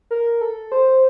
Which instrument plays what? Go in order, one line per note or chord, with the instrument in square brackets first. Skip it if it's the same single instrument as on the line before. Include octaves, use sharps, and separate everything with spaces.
[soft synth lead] A#4
A4
C5